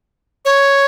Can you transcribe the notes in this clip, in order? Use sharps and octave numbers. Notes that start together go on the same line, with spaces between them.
C#5